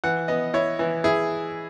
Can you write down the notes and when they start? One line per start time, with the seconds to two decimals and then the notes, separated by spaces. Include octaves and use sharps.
0.04 E3 F#5
0.28 B3 D#5
0.54 E4 C#5
0.79 E3
1.04 E4 G#4